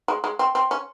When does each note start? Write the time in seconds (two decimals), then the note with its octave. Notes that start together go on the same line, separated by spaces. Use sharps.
0.08 G#3
0.24 G#3
0.39 C4
0.55 C4
0.71 C#4